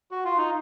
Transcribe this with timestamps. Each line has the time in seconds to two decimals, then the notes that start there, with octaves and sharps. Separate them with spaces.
0.11 F#4
0.25 F4
0.37 D#4